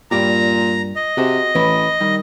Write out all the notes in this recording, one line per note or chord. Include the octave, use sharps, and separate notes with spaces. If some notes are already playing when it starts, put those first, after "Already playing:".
G2 A#2 G4 D5 A#5
D#5
C3 F#4 G#4 C5
A1 E3 B4 C#5
D#3 G3